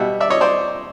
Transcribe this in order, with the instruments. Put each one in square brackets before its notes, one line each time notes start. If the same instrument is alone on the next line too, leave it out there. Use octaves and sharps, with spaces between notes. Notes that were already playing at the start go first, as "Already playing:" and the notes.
Already playing: [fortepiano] B2 G3 E5 F#5
D5 E5
C#5 D#5
C5 D5